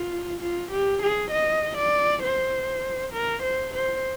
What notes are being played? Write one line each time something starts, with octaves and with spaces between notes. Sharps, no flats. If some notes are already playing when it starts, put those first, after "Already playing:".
Already playing: F4
F4
G4
G#4
D#5
D5
C5
A#4
C5
C5